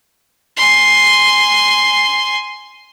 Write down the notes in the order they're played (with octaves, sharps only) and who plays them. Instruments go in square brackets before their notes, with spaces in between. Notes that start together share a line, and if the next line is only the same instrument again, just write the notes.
[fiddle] G#5 C6